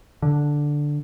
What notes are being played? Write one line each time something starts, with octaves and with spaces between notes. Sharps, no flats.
D3